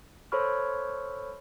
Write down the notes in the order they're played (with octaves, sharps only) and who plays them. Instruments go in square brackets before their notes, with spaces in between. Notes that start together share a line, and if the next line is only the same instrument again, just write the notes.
[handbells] A4 C5 C#5 B5 C#6 F6